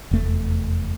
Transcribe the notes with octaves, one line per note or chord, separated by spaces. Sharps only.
F1 E2 A3